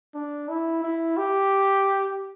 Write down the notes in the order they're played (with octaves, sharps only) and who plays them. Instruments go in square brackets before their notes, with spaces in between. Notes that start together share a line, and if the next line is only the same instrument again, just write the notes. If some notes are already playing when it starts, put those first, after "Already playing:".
[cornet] D4
E4
E4
G4